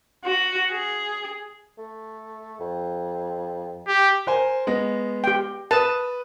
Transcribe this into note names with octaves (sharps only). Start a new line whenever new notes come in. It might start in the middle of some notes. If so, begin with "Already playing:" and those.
F#4
G#4
A3
F2
G4
A#4 C5 G#5
G#3 B3 A#6
G4 G5
B4 A5 D#6